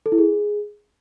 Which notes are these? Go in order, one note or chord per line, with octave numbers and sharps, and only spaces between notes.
A4
E4
G#4